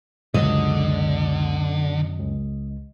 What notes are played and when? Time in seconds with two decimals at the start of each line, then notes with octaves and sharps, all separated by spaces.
0.34 C#2 F#2 B2 D3 F#3 D#5
2.20 C#2